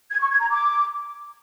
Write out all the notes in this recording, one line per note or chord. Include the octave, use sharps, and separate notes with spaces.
G#6
C#6
G#6
A#5
D6